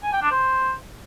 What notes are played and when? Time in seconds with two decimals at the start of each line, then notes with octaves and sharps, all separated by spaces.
0.03 G#5
0.13 G5
0.22 D4
0.32 C5